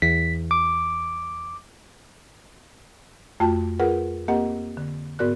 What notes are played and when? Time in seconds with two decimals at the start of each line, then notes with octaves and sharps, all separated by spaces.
0.02 E2 B6
0.51 D6
3.40 F2 A3 F4 F#4 G5 A5
3.80 F4 G#4 A#4 B4 F#5
4.28 A#3 C4 G4 A#4 D#5 F#5
4.77 D3
5.19 G#2 B3 F#4 A#4 D5 F#6